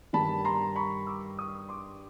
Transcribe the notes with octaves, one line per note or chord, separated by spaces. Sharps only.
G2 D#3 G3 A5 B5
A#5 C6
B5 C#6
D6 E6
C#6 D#6
C6 D6